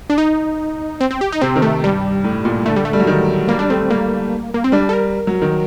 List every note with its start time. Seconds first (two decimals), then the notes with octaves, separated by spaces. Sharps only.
0.10 D4
0.18 D#4
1.01 C4
1.11 C4
1.21 G4
1.32 D#4
1.42 C3 C4
1.56 D#3
1.62 A3
1.84 G2 G3
2.24 A2
2.45 A#2
2.66 D3 A3
2.76 G3
2.85 A3
2.93 G3
3.00 F#3
3.07 D#3
3.48 G3 A#3
3.59 G3 D4
3.70 A3 C4
3.90 G3 A#3
4.54 A#3
4.64 C4
4.72 G3 D4
4.89 A4
4.93 A#4
5.27 F#3
5.42 D#3